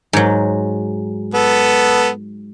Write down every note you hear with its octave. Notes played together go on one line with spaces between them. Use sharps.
G#2 F#3
B3 A4